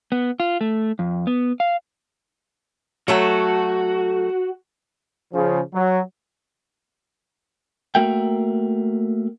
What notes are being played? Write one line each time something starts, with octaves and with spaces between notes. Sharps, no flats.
B3
F4
A3
F2
B3
F5
F#3 A3 F#4 A4
C#3 F3
F#3
A3 A#3 F#4 A#4 E5 G5